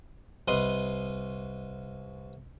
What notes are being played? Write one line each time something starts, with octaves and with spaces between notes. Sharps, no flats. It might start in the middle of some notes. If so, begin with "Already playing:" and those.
C2 B4 D#5 C6